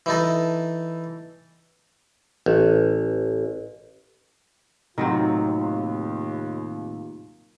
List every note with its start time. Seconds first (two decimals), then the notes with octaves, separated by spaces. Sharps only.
0.06 E3 D#4 A4
2.46 A1
4.98 D#2 A2 C3 D#3 F#3 C4 F4